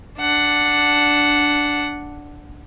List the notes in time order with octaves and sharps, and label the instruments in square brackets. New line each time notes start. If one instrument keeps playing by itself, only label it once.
[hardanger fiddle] D4 F#5